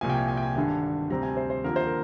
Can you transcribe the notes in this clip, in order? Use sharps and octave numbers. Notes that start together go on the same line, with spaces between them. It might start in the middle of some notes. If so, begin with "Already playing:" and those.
C2 A#2 F3 G#5
G5
G#5
G#5
G5
G#5
G#1 G2 D3 G#5
D2 C3 G3 C4 A#5
G#5
C5
C5
D#2 D3 F3 A#3 A#4
C5
A#4